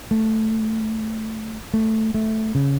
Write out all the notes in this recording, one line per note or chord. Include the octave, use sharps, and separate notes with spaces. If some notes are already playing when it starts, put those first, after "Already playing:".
A3
A3
A3
C#3